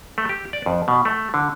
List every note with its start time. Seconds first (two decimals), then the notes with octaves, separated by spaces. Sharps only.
0.18 A3
0.29 G4
0.53 D5
0.66 F2
0.88 B2
1.05 A3
1.34 D3